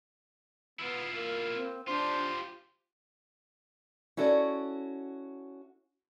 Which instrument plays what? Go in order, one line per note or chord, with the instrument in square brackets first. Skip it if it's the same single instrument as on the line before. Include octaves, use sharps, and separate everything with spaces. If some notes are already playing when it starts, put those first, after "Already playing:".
[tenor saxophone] B3 [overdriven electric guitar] E4 F4
[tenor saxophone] A#3
[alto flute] C4
[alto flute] D4 [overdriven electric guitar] F4 G4 [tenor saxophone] C5
[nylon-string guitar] C#4 E4 F#4 A4 B4 D5